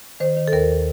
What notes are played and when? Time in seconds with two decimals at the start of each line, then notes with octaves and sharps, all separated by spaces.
0.20 D#3 C5
0.37 D#3
0.48 A4
0.52 D#2 A#4